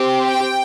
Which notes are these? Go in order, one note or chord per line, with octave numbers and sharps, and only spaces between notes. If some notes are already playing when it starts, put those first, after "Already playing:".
Already playing: C4 G4
G5